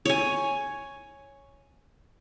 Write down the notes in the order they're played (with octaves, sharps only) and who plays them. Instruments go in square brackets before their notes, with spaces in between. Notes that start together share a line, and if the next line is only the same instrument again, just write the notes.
[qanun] C#5 G#5